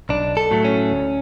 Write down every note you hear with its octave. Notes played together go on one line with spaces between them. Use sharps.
B1 D4
A4
A2 F#3 A3
C#4
D2